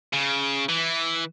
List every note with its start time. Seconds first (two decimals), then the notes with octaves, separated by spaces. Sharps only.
0.13 C#3
0.69 E3